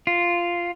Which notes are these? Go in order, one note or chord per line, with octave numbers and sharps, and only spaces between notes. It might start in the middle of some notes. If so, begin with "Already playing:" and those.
F4